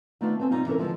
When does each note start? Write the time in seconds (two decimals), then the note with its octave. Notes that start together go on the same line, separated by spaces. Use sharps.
0.21 D#3 A3 B3 D4 F4
0.40 B3 C4 G#5
0.51 C3 G3 D#4 F4
0.66 E3 C#4 E4 A4 A#4
0.78 D3 E3 F3 G#3